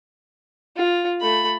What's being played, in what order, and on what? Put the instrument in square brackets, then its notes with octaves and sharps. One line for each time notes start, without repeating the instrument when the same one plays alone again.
[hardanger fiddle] F4
A3 B5